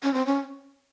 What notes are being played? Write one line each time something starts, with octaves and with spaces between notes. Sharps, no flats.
C#4
C4
C#4